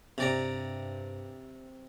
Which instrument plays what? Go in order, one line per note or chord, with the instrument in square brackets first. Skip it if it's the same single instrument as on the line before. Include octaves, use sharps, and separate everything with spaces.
[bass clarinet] G2 [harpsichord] C3 D5 A#5